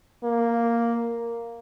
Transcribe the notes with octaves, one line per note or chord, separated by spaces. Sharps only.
A#3